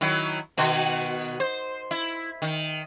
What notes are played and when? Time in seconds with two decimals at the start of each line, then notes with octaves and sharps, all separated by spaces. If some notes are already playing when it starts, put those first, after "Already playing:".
0.01 D#3 F#3 E4
0.57 B2 D#3 F#4
1.40 C5
1.91 E4
2.42 D#3